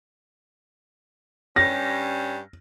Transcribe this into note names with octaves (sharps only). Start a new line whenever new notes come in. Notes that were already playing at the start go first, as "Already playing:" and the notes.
G2 G3 C#4 A#6